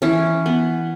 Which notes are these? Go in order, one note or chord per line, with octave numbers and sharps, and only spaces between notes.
E3 C#4
B3